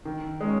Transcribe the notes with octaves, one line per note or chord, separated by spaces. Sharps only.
D#3
G#3 C#4